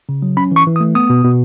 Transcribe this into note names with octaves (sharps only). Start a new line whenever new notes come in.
C#3
F#3
C#4 B5
E3 C#6
E3
D#6
A3
B3 D#6
B2
B2